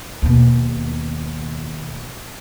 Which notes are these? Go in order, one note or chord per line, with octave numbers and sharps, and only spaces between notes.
D#2 B2